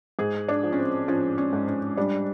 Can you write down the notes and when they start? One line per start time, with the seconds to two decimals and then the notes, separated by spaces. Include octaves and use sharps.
0.19 G#2 G#4
0.49 D4
0.64 F3
0.73 C#4
0.79 C4
1.08 F3 C#4
1.38 C#4
1.53 G#2
1.68 C#4
1.97 G3 D4